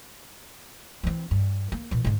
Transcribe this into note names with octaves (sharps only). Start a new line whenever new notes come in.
E3 C4
G2
A#3
A#2 E3
G#2 D3